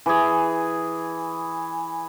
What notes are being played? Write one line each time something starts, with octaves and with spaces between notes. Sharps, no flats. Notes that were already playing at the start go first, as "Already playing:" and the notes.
E3 G#4